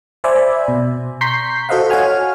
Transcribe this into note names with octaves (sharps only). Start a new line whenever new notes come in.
C5 D5 E5 G#5 B5
B2
A#5 C6 C#6 G6 B6 C7
F#4 A4 C5 D#5 F5 F#5
F#4 C#5 F5 F#5 G#5 F6